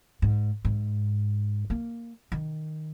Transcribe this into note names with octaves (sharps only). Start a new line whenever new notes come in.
G#2
G#2
A#3
D#3